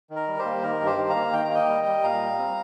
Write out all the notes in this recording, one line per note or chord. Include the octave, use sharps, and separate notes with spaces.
D#3
A#4
G3
G4 C5
A#3
D#3 A#4
G2
G4 C5
D#3
F5 A#5
A#3
D#3 G5
A#5
A#3 D#5 G5
G3
G3
A#2 F5 A#5
G3
C4